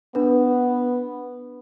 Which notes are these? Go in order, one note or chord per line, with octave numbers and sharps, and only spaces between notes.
B3 D4 B4